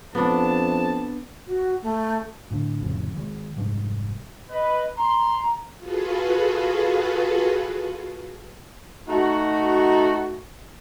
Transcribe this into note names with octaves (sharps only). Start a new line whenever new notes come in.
F2 B3 D4 A5
F#4
A3
A2 D3
F1 F2 A2 C#3
D#3 G#3
F1 G#2 G3 G#3
B4 D#5
A#5 C6
F4 F#4 G#4 A4 B4
A3 D#4 F#4